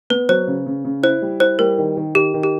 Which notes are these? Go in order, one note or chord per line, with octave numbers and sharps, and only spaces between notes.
B3 B4
F#3 C5
C#3
C#3
C#3
E4 C5
G3
E4 C5
G3 A#4
D#3
D#3
D#3 G4
D#3
G4